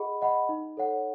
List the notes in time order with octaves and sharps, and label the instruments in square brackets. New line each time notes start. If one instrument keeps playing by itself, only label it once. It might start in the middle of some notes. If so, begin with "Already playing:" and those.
Already playing: [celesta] G#4 D#5 F#5 B5
D#5 F#5 B5
D#4
A4 C#5 F#5